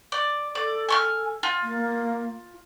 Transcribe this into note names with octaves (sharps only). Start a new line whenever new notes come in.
D5
A4 D5
G#5 C#6 F6
F4
A#3